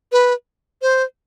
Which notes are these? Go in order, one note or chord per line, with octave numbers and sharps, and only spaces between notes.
B4
C5